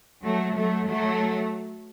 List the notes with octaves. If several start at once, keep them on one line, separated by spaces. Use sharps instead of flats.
F#3 A3
F#3 A3
F#3 A3